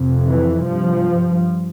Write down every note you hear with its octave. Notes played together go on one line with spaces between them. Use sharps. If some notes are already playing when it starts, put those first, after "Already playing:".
Already playing: F2 C3
E3
G2 F3